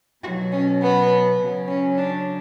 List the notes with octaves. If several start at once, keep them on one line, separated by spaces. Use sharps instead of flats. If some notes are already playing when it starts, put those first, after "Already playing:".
B2 F#3 F#4
C#4
B3
C#3 F#3
C#4
D4